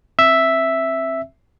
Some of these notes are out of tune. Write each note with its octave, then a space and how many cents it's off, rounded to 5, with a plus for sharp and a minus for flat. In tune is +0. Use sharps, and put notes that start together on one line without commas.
C4 +25 E5 +0 E6 +0